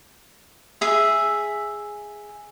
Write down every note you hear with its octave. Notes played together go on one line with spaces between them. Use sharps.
G#4 E5